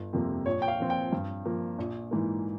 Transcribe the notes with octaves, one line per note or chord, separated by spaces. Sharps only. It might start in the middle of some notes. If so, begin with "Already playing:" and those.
Already playing: G1
F2 C3 G3 A#3
A#1 C#5
G5
F5
A#2 F3 C4
G5
G2
F3 A#3
A#1
G#2 E3 A#3